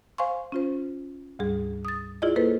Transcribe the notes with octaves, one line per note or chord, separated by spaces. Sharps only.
C5 F5 G#5 C6 C#6
C#4 F4 C5
D2 G#2 G3 G#4
D#6 A6
E4 F4 G#4 D5 D#5
A#3 E4 A4 B4 C5